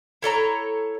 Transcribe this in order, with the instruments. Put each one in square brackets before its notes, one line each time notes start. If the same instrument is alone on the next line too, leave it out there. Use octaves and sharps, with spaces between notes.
[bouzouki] E4 A4 C#5 A#5